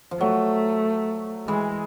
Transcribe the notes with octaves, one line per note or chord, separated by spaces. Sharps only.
F3
F#3 A3
E3 G#3